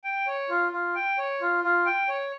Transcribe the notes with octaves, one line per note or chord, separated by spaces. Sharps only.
G5
C#5
F4
F4
G5
C#5
F4
F4
G5
C#5